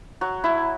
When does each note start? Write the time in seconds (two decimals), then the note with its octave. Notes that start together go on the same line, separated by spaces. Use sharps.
0.21 F#3
0.44 E4